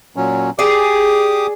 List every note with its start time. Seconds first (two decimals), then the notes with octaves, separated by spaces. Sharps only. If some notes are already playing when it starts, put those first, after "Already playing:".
0.16 A#2 F#3 C#4
0.59 G4 G#4 D5 D6 D#6